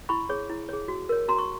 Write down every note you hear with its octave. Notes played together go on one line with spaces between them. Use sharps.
E4 B5 C#6
G#4 C#5
E4
G#4 C#5
F#4
A#4 C#5
F#4 A#5 C6
C#6